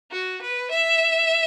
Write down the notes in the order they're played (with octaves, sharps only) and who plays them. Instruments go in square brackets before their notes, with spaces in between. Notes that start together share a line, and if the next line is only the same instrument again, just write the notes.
[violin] F#4
B4
E5